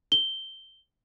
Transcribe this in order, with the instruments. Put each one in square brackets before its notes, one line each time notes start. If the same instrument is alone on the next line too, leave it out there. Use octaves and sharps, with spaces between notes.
[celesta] G7